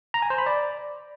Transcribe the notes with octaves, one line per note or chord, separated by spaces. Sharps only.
A#5
G#5
C5
B5
D5